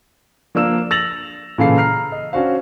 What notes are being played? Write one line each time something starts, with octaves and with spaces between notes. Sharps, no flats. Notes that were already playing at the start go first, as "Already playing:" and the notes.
F3 A#3 D4 E6 E7
E6 A6 A#6 F7 F#7
A#2 C#3 E3 A4 F5 C7
A#5 F6 C7
D#5
C#4 D4 F#4 C5 F5